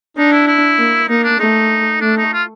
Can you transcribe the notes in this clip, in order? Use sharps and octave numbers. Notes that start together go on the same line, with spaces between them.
D4 D#4
E4
E4
A#3
A#3 D#4
D4
A3 D#4
A3 D4
D#4
F4